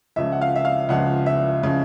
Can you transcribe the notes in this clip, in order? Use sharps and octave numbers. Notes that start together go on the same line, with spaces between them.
C#2 C#3 F3 E5
F#5
F5
E5
F5
C#2 C#3 F3 F#5
E5
C#3 F3